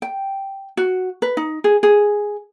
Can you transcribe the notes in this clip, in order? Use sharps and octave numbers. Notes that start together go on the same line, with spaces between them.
G5
F#4
B4
D#4
G#4
G#4